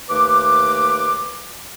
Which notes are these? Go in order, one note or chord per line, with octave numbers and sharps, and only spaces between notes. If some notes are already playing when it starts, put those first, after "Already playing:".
D#2 A3 B4 D6